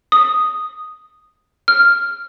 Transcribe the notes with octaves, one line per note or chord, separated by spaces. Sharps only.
D#6
F6